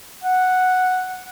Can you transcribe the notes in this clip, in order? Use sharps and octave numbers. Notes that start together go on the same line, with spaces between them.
F#5